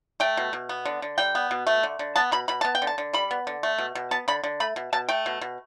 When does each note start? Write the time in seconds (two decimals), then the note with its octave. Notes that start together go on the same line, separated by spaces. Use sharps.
0.20 A3 G5
0.37 B2
0.53 B2
0.69 B3
0.85 D3
1.02 D3
1.18 G3 G5
1.35 B3
1.51 B2
1.67 A3
1.83 D3
1.99 D3
2.16 B3 A5
2.32 B2 B5
2.48 B2 B5
2.61 B3 A5
2.75 G5
2.82 D3
2.87 A5
2.98 D3
3.13 G3 B5
3.31 B3
3.47 D3
3.63 A3
3.78 B2
3.95 B2
4.11 B3 A5
4.28 D3 B5
4.44 D3
4.60 A3 B5
4.76 B2
4.93 B2 A5
5.09 A3 G5
5.26 B2
5.41 B2